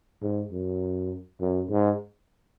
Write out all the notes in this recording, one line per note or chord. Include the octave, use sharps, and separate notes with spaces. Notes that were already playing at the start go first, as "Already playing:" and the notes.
G#2
F#2
F#2
G#2